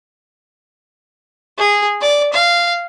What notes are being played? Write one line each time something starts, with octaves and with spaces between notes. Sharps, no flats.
G#4
D5
F5